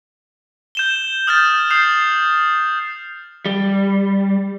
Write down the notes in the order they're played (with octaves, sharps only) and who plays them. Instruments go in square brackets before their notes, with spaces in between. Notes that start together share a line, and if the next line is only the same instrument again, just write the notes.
[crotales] G6 E7 G7
D#6 F6 G6 A6
D#6 G6 C7 F7
[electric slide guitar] G3